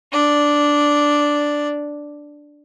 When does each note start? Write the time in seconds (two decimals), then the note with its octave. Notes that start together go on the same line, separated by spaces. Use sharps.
0.12 D4 D5